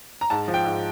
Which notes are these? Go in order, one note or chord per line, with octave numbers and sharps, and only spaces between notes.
A#5
G#2 A5
F3
G5
G#2